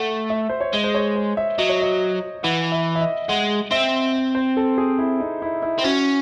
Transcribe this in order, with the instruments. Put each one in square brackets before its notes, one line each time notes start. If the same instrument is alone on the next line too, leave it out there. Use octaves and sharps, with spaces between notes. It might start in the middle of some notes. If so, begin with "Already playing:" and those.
Already playing: [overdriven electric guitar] A3 [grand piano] F#5
[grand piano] E5
C5
C#5
[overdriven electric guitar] G#3 [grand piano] D#5
[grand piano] C5
C#5
C5
E5
[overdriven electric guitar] F#3 [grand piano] D#5
[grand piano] C#5
D#5
[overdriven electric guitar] E3 [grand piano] F#5
[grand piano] E5
E5
D#5
[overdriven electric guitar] G#3 [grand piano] F#5
[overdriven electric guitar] C4 [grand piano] E5
[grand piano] C5
A4
G#4
E4
D#4
E4
E4
[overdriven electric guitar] C4
[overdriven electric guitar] C#4 [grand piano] F#4